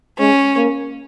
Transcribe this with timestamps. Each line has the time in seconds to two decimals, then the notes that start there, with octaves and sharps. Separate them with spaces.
0.19 G#3 C#4
0.56 A#3